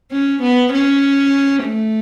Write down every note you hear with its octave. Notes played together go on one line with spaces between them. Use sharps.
C#4
B3
C#4
A3